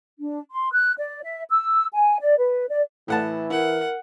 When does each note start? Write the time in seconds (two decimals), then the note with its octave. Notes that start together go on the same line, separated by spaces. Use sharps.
0.20 D4
0.52 C6
0.71 F#6
0.98 D5
1.23 E5
1.49 E6
1.94 G#5
2.21 D5
2.37 B4
2.69 D5
3.08 A2 E3 F#5 A5
3.50 E4 A#4 F#5